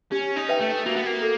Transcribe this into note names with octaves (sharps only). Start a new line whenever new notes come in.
C#4 G4
D#4
B4 E5 G5
A3
A#3 F#4
B3
A#3
A4